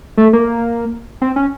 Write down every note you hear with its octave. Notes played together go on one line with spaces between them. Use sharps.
A3
A#3
C4
C#4